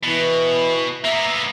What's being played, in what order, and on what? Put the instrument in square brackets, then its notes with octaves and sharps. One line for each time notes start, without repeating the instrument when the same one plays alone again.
[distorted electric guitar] B2 [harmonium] E3
[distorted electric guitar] A#3 B3 [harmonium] E5 A#5